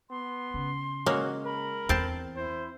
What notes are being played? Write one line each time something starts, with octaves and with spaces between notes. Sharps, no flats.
B3 C6
C#3
G#3 A#3 C#4 F#4
A#4 B5
E2 C4 A5
E4 C5